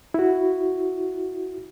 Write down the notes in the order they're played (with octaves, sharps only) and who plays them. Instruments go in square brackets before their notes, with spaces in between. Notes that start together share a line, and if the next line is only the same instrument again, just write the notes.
[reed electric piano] E4 F#4